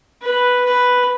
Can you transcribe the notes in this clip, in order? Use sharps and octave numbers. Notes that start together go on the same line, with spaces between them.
B4
B4